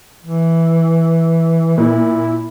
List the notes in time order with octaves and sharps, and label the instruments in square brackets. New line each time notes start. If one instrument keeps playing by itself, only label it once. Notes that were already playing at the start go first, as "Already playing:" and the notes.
[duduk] E3
[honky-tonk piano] A#2 [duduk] E4